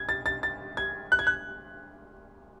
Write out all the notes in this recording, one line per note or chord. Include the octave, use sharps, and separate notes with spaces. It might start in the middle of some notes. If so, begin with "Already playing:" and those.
Already playing: G#6
A6
A6
A6
G#6
F#6
G#6
F#6